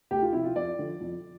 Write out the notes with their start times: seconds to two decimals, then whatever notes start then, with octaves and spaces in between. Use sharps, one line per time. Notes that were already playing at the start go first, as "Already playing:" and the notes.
0.11 D2 G4
0.22 F4
0.33 C3 F3 E4
0.44 F4
0.56 F2 D5
0.79 D3 F3
1.01 F2